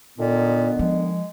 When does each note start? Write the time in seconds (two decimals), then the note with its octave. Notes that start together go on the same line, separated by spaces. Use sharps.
0.18 A#2 D3 D#3 B3
0.79 F3 G#3